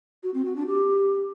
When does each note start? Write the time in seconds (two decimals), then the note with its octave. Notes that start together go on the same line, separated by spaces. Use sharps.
0.23 F#4
0.34 C4
0.45 F#4
0.56 D4
0.67 G4